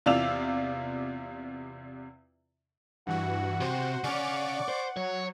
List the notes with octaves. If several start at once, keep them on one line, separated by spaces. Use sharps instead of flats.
E2 C3 F4 D5 E6 F7
G2 E3 F#4 F#5
C3 F#4 C5
C#3 C#4 D5 C#6 D6
C5
F#3 C#5